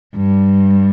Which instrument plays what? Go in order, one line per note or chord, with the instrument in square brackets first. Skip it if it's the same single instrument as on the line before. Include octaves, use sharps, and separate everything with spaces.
[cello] G2